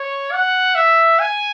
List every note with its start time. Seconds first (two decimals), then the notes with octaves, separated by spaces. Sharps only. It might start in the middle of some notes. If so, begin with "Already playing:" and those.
Already playing: C#5
0.32 F#5
0.75 E5
1.19 G#5